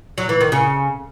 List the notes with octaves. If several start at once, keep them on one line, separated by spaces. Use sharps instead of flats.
F#3
E3
D#3
C#3